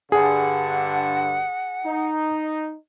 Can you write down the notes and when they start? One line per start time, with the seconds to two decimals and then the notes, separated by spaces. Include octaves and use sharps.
0.12 G2 D3 G#4 F#5
1.85 D#4